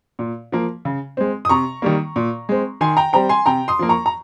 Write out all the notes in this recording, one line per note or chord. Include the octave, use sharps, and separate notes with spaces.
A#2
F3 A#3
C#3
G#3 C4
D#6
C3 A#5 C#6
D#3 G3 A#3
A#2
G#3 C4
D#3 G#5 C6
G5 A#5
G3 C4 G5 A#5
G#5 C6
C3 G5 A#5
C6 D#6
F3 A#3
A#5 C#6
A#5